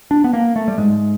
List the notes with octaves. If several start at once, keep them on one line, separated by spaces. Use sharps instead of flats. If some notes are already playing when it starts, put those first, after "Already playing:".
D4
B3
A#3
A3
G3
G#2 G#3